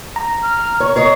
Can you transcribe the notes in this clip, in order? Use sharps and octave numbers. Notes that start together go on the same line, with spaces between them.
A#5
F6
C#5 C#6
C#5 D#5 C7